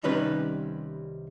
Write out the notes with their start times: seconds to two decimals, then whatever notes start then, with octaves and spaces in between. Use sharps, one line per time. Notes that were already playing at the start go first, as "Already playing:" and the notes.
0.03 C2 C3 D#3 G3 C#4 B4